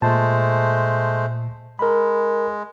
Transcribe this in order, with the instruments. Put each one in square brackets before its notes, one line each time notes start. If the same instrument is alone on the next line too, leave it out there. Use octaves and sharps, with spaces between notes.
[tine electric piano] A#2 A5 [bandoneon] G#3 A3 C5
[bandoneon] G#3 [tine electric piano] A#4 B5